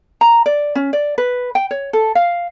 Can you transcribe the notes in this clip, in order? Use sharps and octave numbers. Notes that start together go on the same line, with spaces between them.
A#5
D5
C#4
D5
B4
G5
C#5
A4
F5